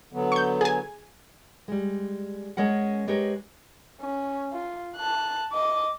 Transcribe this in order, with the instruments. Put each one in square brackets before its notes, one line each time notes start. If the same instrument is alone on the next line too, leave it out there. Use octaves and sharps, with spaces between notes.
[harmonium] D3 F#3 B3
[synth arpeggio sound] C#6 G6
G#4 G#5
[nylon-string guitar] G3 G#3
G#3 C#4 A#4 F#5
G#3 G4 A#4 B4 C#5
[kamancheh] C#4
F4
A5 F#6
D#5 D6